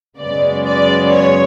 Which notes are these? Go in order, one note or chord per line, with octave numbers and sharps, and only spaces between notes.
F#2 C#3 G#3 B3 D5
D5
C#5